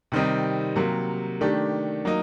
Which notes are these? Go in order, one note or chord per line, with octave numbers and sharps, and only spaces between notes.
C3 D#3 G3 C4 D#4
C3 F#3 A#3
D#3 A3 D4 G4
F#3 A#3 D#4